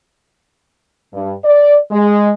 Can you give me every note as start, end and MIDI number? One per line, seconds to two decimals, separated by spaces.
1.13 1.33 43
1.45 1.77 74
1.91 2.31 56